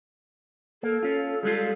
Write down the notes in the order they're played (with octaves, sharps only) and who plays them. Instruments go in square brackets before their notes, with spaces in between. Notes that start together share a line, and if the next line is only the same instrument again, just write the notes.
[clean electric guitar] A#3 [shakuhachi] A4
[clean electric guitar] C#4 F4
G3 G#3 F4